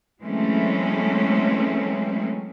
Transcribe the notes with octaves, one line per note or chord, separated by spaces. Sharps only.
E3 F#3 G#3 A3 C4 C#4